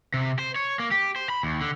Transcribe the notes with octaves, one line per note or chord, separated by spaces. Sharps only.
C3
C5
C#5
A#3
G4
C5
B5
D#2
D3